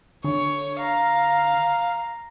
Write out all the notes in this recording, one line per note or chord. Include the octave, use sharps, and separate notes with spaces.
D3 C#5
F5 A#5